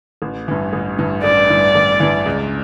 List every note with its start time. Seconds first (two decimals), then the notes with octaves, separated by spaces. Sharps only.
0.22 A1
0.48 G2 E3
0.73 A1
0.99 G2 E3
1.24 A1 D5
1.50 G2 E3
1.75 A1
2.00 G2 E3
2.26 C#2